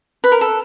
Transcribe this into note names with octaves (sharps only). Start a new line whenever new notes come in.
B4
A#4
A4